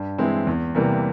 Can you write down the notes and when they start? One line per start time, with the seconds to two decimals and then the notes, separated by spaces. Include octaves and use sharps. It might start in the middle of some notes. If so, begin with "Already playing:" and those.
Already playing: G2
0.18 E3 G#3 C4 E4
0.47 E2
0.75 C3 E3 G3 A#3